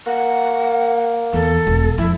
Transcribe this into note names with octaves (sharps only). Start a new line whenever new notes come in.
A#3 F#5
E2 A4
E1
F2 E4